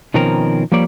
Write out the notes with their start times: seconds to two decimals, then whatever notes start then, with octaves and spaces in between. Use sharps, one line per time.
0.14 B2 D#3 F3 C4 C#4 A#4
0.72 F3 G3 A#3 C#5 D5